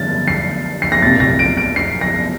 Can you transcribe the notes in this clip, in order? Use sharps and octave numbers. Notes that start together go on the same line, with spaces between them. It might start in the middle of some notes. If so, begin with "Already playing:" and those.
Already playing: G2 D3 A6
C7
C7
A#6
C2 A#2 A6
A#6
D7
D7
C7
A#6